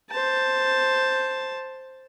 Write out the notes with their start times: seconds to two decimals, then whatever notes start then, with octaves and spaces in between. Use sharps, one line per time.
0.10 C5 A5